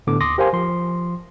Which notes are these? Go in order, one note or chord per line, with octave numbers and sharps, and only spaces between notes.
A2 D3 B3 D6
D#2 C6 D6 D#6 A#6
G4 A#4 C5 F5 G#5 C6
F3 C6